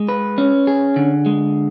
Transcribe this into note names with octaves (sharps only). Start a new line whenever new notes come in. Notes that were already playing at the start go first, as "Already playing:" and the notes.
Already playing: G#3
B4
C#4
G#4
D3
G#3